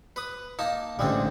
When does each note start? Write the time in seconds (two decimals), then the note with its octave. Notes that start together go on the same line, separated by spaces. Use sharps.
0.16 B4 D#6
0.59 A#3 D#4 A5
0.99 A1 D3 G3 G#3 C4